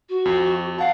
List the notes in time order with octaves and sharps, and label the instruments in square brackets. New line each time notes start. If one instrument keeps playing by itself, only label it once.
[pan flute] F#4
[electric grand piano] F2
[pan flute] F5 [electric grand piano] F#5 A5